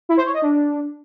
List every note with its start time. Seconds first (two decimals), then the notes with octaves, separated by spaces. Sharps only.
0.09 E4
0.17 C5
0.25 C#5
0.34 D#5
0.42 D4